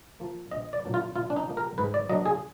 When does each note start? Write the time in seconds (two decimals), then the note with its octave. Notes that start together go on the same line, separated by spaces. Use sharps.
0.20 F3 A#3
0.51 A#1 D#5
0.73 D5
0.84 A#2 F#3 D4
0.94 F4
1.15 A#2 F4
1.30 D4
1.36 D#4
1.47 F3 A#3
1.57 A#4
1.78 G#2 B4
1.94 D5
2.09 F#3 A#3 D4 D#5
2.26 G#4